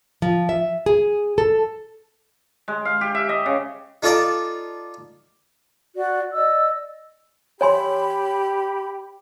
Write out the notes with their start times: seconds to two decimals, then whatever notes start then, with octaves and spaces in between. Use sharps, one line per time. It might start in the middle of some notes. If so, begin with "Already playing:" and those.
0.22 F3
0.49 E5
0.86 G#4
1.38 A4
2.68 G#3
2.85 F5
3.01 G4
3.15 E5
3.29 D#5
3.46 C#3
4.03 D#4 F4 A4 D5 A5 A#5
5.96 F#4 D5
6.34 D5 D#5 E6
7.61 G4 C#5 G#5 B5 C6